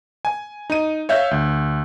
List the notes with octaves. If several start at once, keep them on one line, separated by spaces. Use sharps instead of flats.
G#5
D#4 D#7
C#5 E5 F5 G6
D2